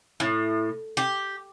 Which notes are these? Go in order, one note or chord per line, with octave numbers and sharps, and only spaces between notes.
A2
G4